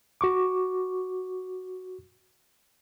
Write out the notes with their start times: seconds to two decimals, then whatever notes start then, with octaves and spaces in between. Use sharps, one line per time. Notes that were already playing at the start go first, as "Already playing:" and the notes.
0.21 F#4 C#6 D6